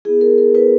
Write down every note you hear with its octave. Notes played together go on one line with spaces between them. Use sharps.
B3 E4 G#4
A#4
A#4
B3 E4 B4